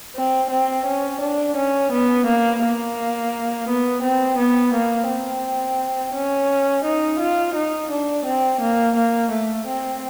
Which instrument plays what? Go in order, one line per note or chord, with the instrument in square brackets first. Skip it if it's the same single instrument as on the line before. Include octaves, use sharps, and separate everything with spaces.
[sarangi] C4
C4
C#4
D4
C#4
B3
A#3
A#3
B3
C4
B3
A#3
C4
C#4
D#4
F4
D#4
D4
C4
A#3
A#3
A3
C4